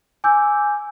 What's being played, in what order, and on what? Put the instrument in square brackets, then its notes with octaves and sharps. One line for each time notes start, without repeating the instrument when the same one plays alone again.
[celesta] G#5 D6 E6 G6